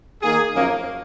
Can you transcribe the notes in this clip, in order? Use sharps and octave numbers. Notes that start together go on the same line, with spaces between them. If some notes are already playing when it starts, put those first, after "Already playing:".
D#3 A#3 D#4 G#4
F#2 F3 A#3 C#4